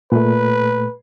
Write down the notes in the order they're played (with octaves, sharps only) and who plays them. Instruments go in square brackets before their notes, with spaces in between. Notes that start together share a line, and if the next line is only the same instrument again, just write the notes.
[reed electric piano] A#2 A3 [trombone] B4